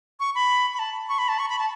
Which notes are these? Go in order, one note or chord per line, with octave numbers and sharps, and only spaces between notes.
C#6
B5
B5
A5
C#6
B5
A5
C#6
B5
A5